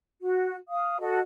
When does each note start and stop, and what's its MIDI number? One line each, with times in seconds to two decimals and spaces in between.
0.21 0.56 66
0.69 0.97 77
0.69 0.97 87
1.00 1.19 66
1.00 1.19 69
1.00 1.19 75